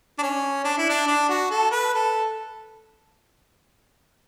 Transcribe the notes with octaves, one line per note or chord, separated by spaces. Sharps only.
D4
C#4
D4
E4
D4
D4
F#4
A4
B4
A4